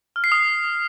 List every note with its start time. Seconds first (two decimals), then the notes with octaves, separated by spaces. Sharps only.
0.16 F6
0.24 C7
0.32 D#6